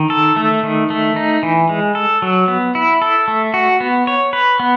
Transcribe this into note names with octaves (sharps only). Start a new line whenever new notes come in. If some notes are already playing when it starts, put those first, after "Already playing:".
Already playing: D#3
A4
A3
D#3
A3
D#4
E3
G#3
A4
F#3
B3
E4
A4
A3
F#4
B3
C#5
B4
B3